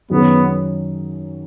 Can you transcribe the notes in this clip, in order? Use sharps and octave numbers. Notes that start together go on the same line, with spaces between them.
F#2 D#3 F#3 B3 C#4 G#4